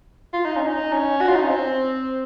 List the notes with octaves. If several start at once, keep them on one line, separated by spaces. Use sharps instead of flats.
F4
D#4
C#4
D#4
C#4
F#4
F4
D#4
C#4
C4